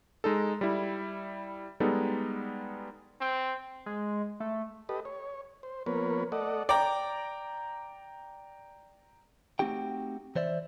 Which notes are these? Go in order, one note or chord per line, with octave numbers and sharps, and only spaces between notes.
G#3 D#4 A4
G3 E4
G3 G#3 B3 D#4 A4
C4
G#3
A3
G4 A4 B4 D#5
C#5
C5
F3 A#3 B3 A#4 B4 C#5
A3 A4 D5 D#5 F#5
D5 G5 A#5
A3 C4 D#4 F#4 G4 G5
E3 C5 D5 E5